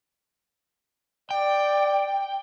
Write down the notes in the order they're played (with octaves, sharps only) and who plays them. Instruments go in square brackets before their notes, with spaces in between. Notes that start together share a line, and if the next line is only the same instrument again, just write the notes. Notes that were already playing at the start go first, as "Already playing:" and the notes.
[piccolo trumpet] D5 [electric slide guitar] G5